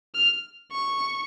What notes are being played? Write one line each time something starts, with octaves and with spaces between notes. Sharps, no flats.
F6
C#6